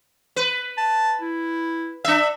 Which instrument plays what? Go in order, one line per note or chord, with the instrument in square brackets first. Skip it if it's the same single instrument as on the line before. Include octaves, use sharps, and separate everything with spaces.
[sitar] B4
[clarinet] A5
E4
[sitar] D4 E5 [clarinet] E6